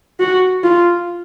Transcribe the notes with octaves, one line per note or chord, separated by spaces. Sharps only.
F#4
F4